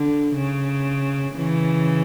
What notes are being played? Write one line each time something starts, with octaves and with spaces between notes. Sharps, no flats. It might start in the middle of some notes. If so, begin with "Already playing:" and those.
Already playing: D3
C#3
C#3 E3